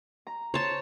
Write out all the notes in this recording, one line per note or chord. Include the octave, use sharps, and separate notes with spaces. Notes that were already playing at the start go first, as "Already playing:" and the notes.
A#5
C5 C#5 A5